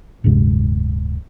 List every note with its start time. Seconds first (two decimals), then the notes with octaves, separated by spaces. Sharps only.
0.24 D1 G2 C3 G#3